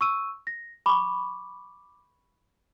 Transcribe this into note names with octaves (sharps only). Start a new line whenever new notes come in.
C#6 E6 D#7
A#6
B5 C#6 D6